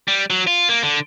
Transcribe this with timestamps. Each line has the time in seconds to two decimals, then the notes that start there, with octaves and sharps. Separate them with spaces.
0.08 G3
0.30 F#3
0.47 F4
0.69 A#3
0.83 D3